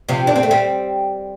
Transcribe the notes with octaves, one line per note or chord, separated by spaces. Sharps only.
C3 F3
D4
C4
A3
G3 C4